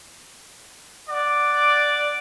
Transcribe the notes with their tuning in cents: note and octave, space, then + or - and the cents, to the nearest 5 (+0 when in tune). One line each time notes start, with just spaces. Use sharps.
D5 +0 F#5 +0